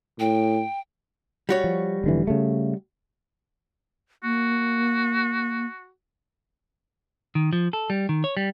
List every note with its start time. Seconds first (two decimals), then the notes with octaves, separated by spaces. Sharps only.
0.19 A2 G5
1.49 G3 F#4 C#5
1.64 F3
2.04 F1 D3 E3
2.27 C#3 A3
4.24 A#3 F#4
7.35 D#3
7.53 F3
7.73 A4
7.90 G3
8.09 D#3
8.24 C#5
8.37 G3